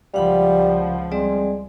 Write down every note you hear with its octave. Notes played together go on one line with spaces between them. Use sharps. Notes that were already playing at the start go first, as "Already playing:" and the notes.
C#2 F3 G3 F5 F#5 B5
G3 G#3 C4 D5